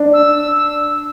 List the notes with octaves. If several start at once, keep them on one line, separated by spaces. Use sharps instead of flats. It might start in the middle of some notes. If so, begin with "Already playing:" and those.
Already playing: D4
E6
E6